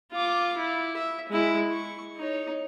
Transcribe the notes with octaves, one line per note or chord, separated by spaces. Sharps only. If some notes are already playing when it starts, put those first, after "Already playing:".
F4 D6
E4
E5
G#3 E4
C#6
D#4 C#5